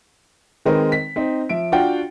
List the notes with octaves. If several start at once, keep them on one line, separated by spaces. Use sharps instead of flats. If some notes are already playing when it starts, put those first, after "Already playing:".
D#3 G#3 C4 D#4 A#4 B4
B6
C4 D#4
F3 E5 D7
D4 F4 F#4 F#5 G5